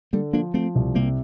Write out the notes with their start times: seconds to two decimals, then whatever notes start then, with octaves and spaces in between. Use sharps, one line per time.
0.13 D3 G3 A#3
0.33 F3 A#3 D4
0.54 F3 A3 C4
0.75 C2
0.95 C3 G3 A#3